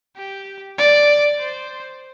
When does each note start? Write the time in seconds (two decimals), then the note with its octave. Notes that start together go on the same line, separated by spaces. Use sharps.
0.16 G4
0.78 D5
1.39 C5